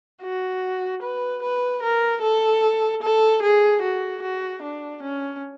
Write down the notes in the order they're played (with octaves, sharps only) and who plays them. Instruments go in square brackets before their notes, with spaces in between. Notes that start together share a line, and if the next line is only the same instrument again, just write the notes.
[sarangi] F#4
B4
B4
A#4
A4
A4
G#4
F#4
F#4
D4
C#4